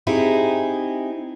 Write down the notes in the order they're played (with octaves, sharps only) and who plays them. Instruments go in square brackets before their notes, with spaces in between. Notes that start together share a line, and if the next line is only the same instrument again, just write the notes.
[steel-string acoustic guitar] C4 D#4 E4 G4 G#4